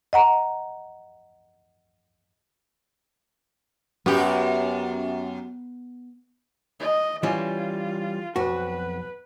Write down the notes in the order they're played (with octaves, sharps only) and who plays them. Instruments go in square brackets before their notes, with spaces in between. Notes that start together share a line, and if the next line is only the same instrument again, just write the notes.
[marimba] D#5 F#5 A#5
[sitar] F#2 F#4 G4 [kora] B3
[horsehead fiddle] D#5
[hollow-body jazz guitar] E3 G3 C#4 [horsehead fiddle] F4
[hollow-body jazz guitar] B1 F2 F#4 [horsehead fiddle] B4